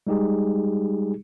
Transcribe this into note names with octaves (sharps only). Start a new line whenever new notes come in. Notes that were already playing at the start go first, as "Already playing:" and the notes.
G3 G#3 D#4 G4 G#4